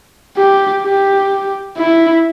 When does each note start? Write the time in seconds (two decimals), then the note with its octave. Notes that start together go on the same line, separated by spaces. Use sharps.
0.37 G4
0.84 G4
1.78 E4